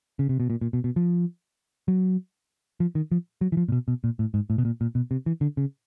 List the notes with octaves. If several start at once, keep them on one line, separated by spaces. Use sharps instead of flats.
C#3
C3
B2
A#2
A#2
B2
B2
F3
F#3
F3
D#3
F3
F#3
E3
F3
A#2
B2
B2
A#2
A2
G#2
A2
B2
A#2
A#2
B2
C3
E3
D3
C#3